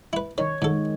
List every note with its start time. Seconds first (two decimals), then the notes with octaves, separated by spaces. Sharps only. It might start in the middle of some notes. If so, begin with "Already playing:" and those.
0.13 E4 B4
0.38 D#3 C#5
0.62 G#2 D#3 G#3 A4